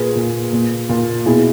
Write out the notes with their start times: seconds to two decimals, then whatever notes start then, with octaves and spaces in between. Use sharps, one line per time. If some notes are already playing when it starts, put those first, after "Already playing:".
Already playing: A#2 G#4 B4
0.16 A#2
0.53 A#2
0.89 A#2
1.26 B2 E4 G#4